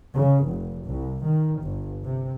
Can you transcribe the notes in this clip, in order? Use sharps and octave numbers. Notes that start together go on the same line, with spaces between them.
C#3
F1
C2
D#3
G1
C3